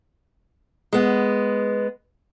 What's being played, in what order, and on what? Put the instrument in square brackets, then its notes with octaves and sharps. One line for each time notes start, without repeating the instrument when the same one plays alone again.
[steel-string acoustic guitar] G#3 B3